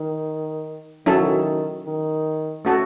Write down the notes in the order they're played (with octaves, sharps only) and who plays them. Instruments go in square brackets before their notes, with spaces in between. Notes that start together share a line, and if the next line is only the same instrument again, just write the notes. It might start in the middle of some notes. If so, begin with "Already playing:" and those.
Already playing: [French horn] D#3
[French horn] D#3 [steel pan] F#3 C#4 E4 A4
[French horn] D#3
[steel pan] A3 C#4 F#4 A4